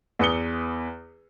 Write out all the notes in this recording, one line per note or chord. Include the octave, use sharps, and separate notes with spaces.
E2 B4 D#6 C#7 G7